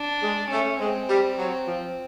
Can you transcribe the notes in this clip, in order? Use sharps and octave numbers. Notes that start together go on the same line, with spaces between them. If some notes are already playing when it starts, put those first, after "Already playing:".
Already playing: D4
G#3
A3 C#4
G#3 C4
G3
F#3
F3